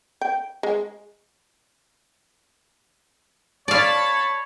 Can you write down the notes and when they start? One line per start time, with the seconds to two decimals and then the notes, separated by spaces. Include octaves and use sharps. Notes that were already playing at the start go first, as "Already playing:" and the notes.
0.21 G5
0.63 G#3
3.68 C#5 D5 F5 A5 B5